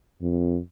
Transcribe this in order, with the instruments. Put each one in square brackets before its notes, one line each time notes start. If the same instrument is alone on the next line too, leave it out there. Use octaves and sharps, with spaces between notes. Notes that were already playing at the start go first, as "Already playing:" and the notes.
[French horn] F2